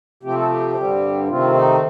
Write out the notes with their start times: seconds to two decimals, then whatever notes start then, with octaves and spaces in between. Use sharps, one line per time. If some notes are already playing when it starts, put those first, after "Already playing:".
0.23 C3 F3 A3 C4 G4
0.36 A4
0.48 G4
0.76 G2 D3 G3 C4
1.28 C3 D#3 A3 C4 F4
1.54 D#4